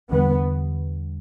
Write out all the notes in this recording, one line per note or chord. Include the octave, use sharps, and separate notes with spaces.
E2 D3 G3 B3